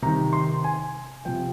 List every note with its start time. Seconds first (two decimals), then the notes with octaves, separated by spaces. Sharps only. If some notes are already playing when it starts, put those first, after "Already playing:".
0.02 C3 D#3 A#5
0.33 C6
0.64 G#5
1.25 C3 F3 G5